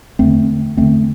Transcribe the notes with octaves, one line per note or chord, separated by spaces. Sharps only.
E2 D3 A3 C4
E2 D3 A3 C4